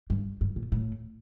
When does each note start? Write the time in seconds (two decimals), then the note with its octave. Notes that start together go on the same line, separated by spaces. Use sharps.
0.10 G2
0.41 G2
0.56 A#2
0.72 A2